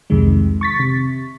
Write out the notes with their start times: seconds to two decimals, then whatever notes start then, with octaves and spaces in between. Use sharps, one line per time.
0.10 C2 F2 C3 D#3 G#3
0.61 C#6 A6 B6
0.80 C3